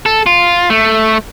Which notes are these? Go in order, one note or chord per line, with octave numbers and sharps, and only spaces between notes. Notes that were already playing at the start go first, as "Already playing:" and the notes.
A4
F4
A3